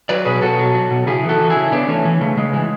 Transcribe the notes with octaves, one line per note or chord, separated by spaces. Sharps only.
F#3 B4 D5
B2 G#4 B4
B2 F#4 A4
F#3
F#3
B2
C#3 E4 G#4
E3
F#4 A4
E3
E4 G#4
C#3
C#3 B3 D4
E3 A3 C#4
E3
C#3 A3
C#3 G#3
E3